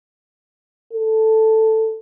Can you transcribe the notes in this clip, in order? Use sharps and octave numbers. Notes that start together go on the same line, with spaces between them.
A4